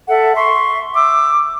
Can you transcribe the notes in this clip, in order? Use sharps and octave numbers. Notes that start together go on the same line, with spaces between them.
A4 E5 F#5
E5 C6 C#6
D6 E6